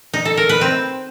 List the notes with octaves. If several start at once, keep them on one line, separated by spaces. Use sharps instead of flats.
D#4
A4
A#4
B4
C4